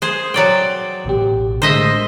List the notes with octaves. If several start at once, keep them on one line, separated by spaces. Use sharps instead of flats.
G#4 C5
F#3 D5 G5
A1 B2 G4
A2 D3 G#3 C5 D#5 E5